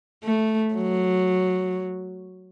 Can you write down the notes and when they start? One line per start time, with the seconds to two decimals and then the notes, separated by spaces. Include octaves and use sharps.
0.23 A3
0.74 F#3